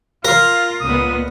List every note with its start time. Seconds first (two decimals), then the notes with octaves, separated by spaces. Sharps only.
0.25 F4 A#4 F5
0.81 C#2 A#2 B3 D#6